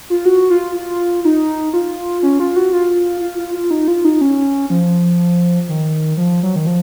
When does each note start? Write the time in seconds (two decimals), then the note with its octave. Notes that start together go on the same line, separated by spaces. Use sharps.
0.10 F4
0.25 F#4
0.50 F4
0.76 F4
1.25 D#4
1.73 F4
2.23 C#4
2.40 F4
2.56 F#4
2.73 F4
3.21 F4
3.38 F4
3.55 F4
3.71 D#4
3.88 F4
4.05 D#4
4.21 C#4
4.70 F3
5.69 D#3
6.17 F3
6.43 F#3
6.56 D#3
6.67 F3